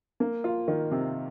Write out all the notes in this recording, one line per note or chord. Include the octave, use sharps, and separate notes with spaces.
A#3
F4
D#3
C3